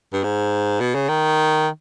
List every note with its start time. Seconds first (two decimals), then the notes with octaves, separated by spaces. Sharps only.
0.13 G2
0.23 G#2
0.80 B2
0.95 C#3
1.09 D#3